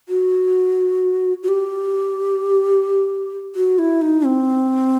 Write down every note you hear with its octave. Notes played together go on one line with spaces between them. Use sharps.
F#4
F#4
G4
F#4
E4
D#4
C4